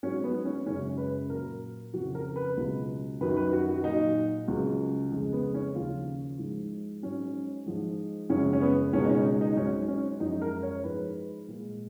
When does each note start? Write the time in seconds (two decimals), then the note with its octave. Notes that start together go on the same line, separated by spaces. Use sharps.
0.03 G#2 F#3 C#4
0.24 B3
0.45 C#4
0.66 F#2 C#3 G#3 C#4
0.98 B4
1.30 A#2 F#3 A#4
1.93 F2 C#3 F3 F#4
2.15 A#4
2.36 B4
2.57 C#2 B2 F#3
3.21 F#2 D#3 F#3 B4
3.37 B4
3.53 F#4
3.69 F#4
3.84 A#2 F#3 D#4
4.48 C#2 C#3 F#3
5.12 F2 C#3 G#3
5.33 B3
5.54 C#4
5.75 D#2 C#3 F3 F4
6.39 G#2 F3 G#3
7.03 G#2 F#3 C#4
7.66 G#2 F3 G#3
8.29 F#2 C#3 F3 G#3 C#4
8.53 C#4
8.61 B3
8.93 C#2 B2 G#3 C#4
9.05 D#4
9.09 C#4
9.25 D#4
9.41 D#4
9.57 G#2 F#3 C#4
9.88 C#4
10.20 F#2 F3 G#3 D#4
10.42 A#4
10.63 C#5
10.84 G#2 F3 G#3 B4
11.48 A#2 G#3